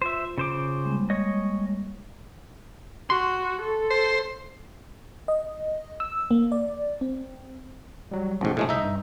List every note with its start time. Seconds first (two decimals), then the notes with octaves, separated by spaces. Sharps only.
0.02 F4 C5 E5
0.38 C#3 C5 D6
0.84 G3 G#3 A#3
1.10 C#5 D#5
3.10 F#4 C6
3.62 A4
3.90 C5
5.28 D#5
6.00 E6
6.31 A#3
6.52 D5
7.01 C4
8.11 F#3 G3
8.41 A1 G#2 B2 D3 F3
8.57 A2 G#3 A3
8.69 C2 D#4 D#5 E5 G6
8.83 G2